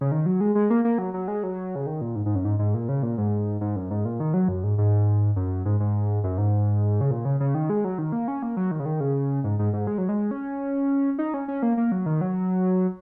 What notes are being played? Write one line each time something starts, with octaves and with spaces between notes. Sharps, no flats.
C#3
D#3
F#3
G#3
G#3
A#3
A#3
F#3
F#3
G#3
F#3
C#3
D#3
A#2
G#2
G#2
F#2
G#2
G#2
A#2
C#3
A#2
G#2
G#2
F#2
G#2
A#2
D#3
F#3
F#2
G#2
G#2
F#2
G#2
G#2
F#2
G#2
C#3
A#2
C#3
C#3
D#3
G#3
F#3
D#3
A#3
C#4
A#3
F#3
D#3
C#3
D#3
C#3
G#2
G#2
G#2
G#3
F#3
G#3
C#4
D#4
C#4
C#4
A#3
A#3
F#3
D#3
F#3